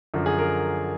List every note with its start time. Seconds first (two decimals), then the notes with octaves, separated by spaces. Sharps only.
0.14 F#2 D3 F3
0.26 G#4
0.39 A#4